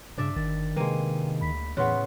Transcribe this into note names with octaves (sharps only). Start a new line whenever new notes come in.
G2 C#3 D4 D5 E5
G1 D#3 A6
C3 G#3 A#3 B4 G5 D#7
D2 B5 B6
E2 A2 C#3 B3 F#5 C6 F#6